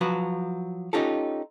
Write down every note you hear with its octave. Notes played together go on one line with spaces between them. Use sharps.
F3 F#3 F#4 B4
C#4 D#4 F4 G4 A4